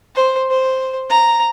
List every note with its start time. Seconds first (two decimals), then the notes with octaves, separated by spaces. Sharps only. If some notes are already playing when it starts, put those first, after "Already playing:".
0.15 C5
0.51 C5
1.10 A#5